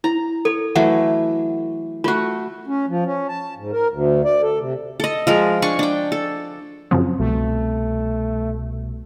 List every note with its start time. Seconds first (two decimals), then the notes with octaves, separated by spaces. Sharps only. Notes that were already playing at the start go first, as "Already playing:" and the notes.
0.04 E4 A#5
0.45 A4 C#5
0.75 E3 F#3 A3 E5 F#5
2.04 A3 F4 F#4
2.67 C#4
2.88 F3
3.06 C#4
3.28 A5
3.57 G#2
3.72 A#4
3.91 D2
4.25 D5
4.42 A4
4.59 C3
5.00 A4 D#5
5.27 F3 G#3 A#4
5.62 D4 G#5 C#6
5.79 D4 G5
6.12 A4
6.91 F#2 C#3 F3 C4
7.19 C2 B2 A3